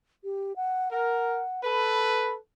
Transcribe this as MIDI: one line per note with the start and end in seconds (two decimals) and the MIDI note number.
0.24 0.56 67
0.56 0.92 78
0.92 1.43 70
0.92 1.62 78
1.64 2.37 69
1.64 2.37 71
1.64 2.34 83